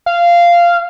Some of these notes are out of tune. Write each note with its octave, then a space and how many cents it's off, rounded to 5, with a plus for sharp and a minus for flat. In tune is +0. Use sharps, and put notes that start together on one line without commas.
F5 -15